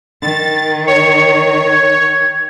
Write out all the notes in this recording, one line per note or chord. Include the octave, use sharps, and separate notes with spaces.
D#3 A6
C#5 C#7
G#6